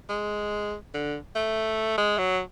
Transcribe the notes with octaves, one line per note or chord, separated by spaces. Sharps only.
G#3
D3
A3
G#3
F#3